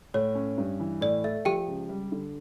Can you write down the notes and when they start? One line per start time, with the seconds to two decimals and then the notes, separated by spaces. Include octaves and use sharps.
0.14 A2 C#5
0.35 C#4
0.58 G2
0.80 E3
1.01 A2 D5
1.24 A3 E5
1.45 F3 G4 G5
1.68 C#2
1.89 G3
2.12 D3